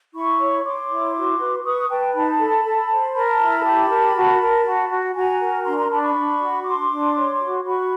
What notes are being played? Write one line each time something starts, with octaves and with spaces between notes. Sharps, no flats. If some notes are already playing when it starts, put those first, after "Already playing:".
E4 B5 C#6
C#5
C#5 C6 D6
E4
F#4
B4
B4 C#6 D#6
B4 G5 A5
D#4 A5 B5
A4
A4
C5
A#4 A5 B5
E4
G4
A#4
F#4
A#4
F#4
F#4
F#4 G#5 A#5
A#4
D4 A#5 C6
A#5 C6
D4 A5 B5
B5 C#6
D4
F#4
D4 C6 D6
D4
C#5
F#4
F#4 B5 C#6